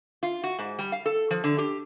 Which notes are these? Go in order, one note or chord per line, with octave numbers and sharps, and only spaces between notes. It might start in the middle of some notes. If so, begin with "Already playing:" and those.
F4
F#4
G#2
G3
F5
A4
F3
D3
G4